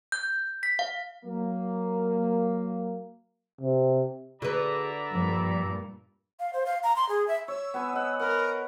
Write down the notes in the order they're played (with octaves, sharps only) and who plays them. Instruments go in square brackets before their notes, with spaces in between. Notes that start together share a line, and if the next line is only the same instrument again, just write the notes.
[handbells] G6
B6
F5
[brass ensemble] F#3 A#3
[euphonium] C3
[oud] D3 B4 [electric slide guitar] F#4 G#4 [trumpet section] D5 E5 A#5
[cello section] G2 A#2 [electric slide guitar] F3
[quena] F5
C5
F5
A#5
C6
G#4
E5
[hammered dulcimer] C#5 [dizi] E6
[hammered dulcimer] B3 B4 G#5
D#5 F#5
[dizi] A#4 [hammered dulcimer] F#5 B5